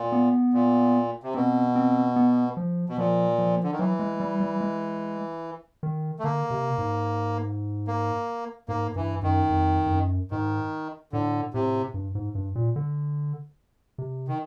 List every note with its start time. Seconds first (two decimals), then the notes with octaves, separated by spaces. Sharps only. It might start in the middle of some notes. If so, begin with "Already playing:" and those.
Already playing: A#2
0.12 B3
0.54 A#2
1.23 C3
1.34 B2 C4
1.75 C4
2.16 B3
2.57 F3
2.89 B2
2.98 A#2 F3
3.38 F3
3.63 D3
3.72 D#3
3.79 E3 F#3
3.99 G#3
4.20 G3
4.40 G3
4.61 G#3
5.83 D#3
6.19 A3
6.23 D3 A#3
6.51 C3
6.78 G#2
7.87 A#3
8.68 G#2 A#3
8.96 G2 E3
9.22 F#2 D#3
9.50 F2
9.86 F2
9.91 F#2
10.31 G#2 D#3
11.12 A2 D3
11.54 A2 C3
11.94 G2
12.15 G#2
12.35 G2
12.55 A#2
12.76 D3
13.98 C3
14.28 D#3